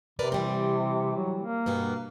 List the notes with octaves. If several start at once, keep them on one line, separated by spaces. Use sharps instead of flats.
C3 A#4 B4 D5
E3 G3 C4
F#3
A#3
G2 B2 B3